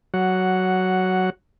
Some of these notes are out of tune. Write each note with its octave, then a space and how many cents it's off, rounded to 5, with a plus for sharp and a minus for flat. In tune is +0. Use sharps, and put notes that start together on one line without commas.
F#3 +10 F#5 +0